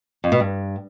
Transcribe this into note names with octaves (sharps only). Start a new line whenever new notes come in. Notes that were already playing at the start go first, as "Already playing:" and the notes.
F2
B2
G2